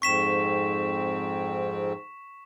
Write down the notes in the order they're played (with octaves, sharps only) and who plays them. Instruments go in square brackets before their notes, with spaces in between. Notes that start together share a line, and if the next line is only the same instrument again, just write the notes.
[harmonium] F2 G#2 C4 [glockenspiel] C#6 B6 E7